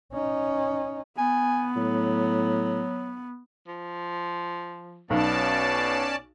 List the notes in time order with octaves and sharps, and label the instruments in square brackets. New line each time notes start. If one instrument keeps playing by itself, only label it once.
[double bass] C#4 D#4
[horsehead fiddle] B3 [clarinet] G#5
[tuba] A2 [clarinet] F#3
[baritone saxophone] F3
[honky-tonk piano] B1 [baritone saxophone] B2 [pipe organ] C#4 D5 A5